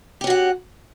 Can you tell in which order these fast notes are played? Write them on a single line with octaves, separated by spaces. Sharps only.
G4 C#4 F#4 F#5